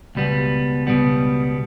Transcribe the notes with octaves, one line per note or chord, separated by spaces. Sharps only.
C#2 B2 G3 B3
C#2 B2 G3 B3